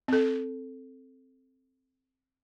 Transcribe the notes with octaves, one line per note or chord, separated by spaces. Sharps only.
C4 A4